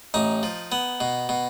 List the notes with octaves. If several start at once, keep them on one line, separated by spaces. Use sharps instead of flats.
A1 D#4
F3
B3
B2
B2